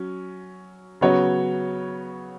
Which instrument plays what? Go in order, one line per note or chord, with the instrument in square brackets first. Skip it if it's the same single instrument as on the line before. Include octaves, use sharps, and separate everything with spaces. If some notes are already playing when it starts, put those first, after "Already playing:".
Already playing: [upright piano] F#3 C#4
C#3 F#3 B3 F#4 C#5